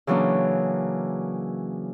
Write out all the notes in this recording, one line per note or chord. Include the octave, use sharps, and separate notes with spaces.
C#3 E3 F#3 A#3 C#4 D4